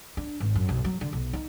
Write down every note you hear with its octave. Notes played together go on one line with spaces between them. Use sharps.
D4
G#1
F#2
B1
F#3
D3
B1
D#4